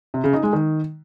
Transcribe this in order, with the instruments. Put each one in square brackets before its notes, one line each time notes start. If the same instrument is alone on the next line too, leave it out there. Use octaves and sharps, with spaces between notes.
[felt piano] C3
C#3
D#4
G#3
D#3